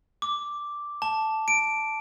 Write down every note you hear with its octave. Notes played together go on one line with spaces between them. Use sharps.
D6
A5
D7